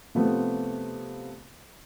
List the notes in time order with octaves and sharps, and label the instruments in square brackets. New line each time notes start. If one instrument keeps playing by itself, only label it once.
[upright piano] C3 F3 A3 B3 C4